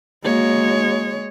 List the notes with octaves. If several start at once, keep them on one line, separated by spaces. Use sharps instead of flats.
G#3 A#3 F#4 C#5